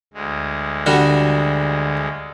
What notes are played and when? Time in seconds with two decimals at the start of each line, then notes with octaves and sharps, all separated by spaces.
0.13 D2 G#3
0.86 D3 G3 F#4